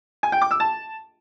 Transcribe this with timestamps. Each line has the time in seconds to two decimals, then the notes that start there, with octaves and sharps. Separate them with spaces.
0.23 G#5
0.32 G5
0.42 D6
0.51 E6
0.60 A5